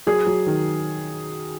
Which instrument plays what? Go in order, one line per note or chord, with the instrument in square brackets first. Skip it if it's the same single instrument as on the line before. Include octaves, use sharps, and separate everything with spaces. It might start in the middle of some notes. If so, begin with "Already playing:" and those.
[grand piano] F#3 [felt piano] G#4
[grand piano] F#3
D#3